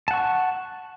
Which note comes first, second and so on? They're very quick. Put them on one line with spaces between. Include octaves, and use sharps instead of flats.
A5 F#5 C#6